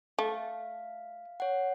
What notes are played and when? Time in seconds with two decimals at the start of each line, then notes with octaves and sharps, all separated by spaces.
0.19 A3 F5
1.40 C#5 F#5